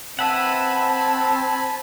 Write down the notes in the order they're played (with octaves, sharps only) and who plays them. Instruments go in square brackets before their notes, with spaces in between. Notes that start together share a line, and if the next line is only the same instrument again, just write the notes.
[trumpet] C4 [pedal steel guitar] B4 E5 F#5 [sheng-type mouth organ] G#5 B5 [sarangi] A5